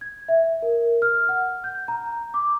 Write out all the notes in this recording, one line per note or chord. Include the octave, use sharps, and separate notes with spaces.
G#6
E5
A#4
F6
F#5
G6
A#5
D6